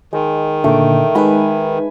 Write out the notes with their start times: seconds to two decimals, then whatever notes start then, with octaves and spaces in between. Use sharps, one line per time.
0.13 D#3 G#3
0.64 A#2 D3 A3 D6
1.15 G#3 D#4 B4 E5 G#5 B5